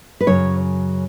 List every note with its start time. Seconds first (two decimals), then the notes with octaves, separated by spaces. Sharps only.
0.21 B4
0.26 F#2 C#3 F#3 C#5